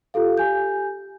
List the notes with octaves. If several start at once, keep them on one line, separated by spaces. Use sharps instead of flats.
F4 G4 A4 F5
G4 G#5 G6